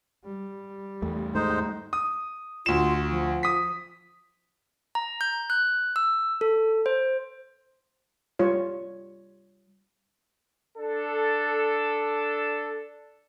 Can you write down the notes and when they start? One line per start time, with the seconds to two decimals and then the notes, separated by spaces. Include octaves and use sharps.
0.24 G3
1.02 E2 A3
1.35 D#2 G#2 G#3 A3 D#4 C5
1.93 D#6
2.66 D2 F4 E7
3.10 F3
3.43 D#6 B6
4.95 A#5
5.21 G6
5.50 F#6
5.96 E6
6.41 A4
6.86 C5
8.39 G3 F4 C#5
10.77 D4 A4